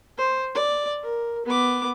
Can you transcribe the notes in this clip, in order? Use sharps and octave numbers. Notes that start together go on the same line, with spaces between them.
C5
D5
A#4
B3 D6